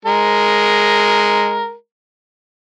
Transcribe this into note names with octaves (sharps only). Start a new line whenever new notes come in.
G#3 A#4